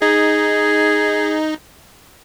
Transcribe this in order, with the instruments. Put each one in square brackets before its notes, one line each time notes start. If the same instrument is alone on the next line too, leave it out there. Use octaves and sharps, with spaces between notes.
[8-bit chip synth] D#4 [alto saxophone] G#4